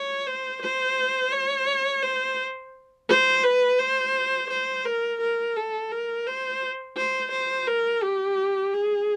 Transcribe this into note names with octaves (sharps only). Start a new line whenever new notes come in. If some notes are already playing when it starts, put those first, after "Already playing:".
Already playing: C#5
C5
C5
C#5
C5
C5
B4
C5
C5
A#4
A#4
A4
A#4
C5
C5
C5
A#4
G4
G#4